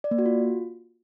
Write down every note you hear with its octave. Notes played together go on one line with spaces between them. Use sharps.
D5
A#3
F#4
F4